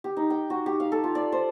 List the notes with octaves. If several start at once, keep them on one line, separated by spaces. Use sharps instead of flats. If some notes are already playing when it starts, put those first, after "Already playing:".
G4
D#4
G5
F#4
G4
F5
A4
F4
D5
C5